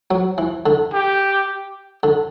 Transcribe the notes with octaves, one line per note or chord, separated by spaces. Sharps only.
F#3
E3
D3
G4
D3